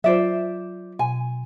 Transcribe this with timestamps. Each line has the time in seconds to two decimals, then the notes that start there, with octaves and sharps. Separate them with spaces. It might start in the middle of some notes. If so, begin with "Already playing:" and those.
0.04 F#3 F4 C5 D5 E5
0.99 B2 G#5